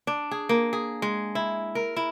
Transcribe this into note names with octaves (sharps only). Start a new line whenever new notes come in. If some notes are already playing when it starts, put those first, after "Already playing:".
D4
G#4
A#3
G#4
G#3
E4
A#4
E4